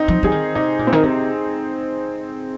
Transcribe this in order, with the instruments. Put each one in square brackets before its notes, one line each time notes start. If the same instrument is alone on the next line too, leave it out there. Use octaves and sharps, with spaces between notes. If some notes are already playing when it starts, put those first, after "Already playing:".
Already playing: [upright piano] C4 D#4
[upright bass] F3
[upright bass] F3 [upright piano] G#4
[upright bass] D#3
[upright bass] C3 [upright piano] D#4
[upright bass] A#2
[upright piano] C4
[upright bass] D#3
C3